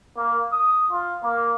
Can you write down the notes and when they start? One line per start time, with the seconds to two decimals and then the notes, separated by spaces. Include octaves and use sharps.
0.16 A#3
0.52 D#6
0.90 F4
1.23 A#3